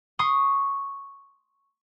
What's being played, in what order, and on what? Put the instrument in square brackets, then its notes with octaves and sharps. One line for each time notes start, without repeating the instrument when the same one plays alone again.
[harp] C6 C#6 D#6 C7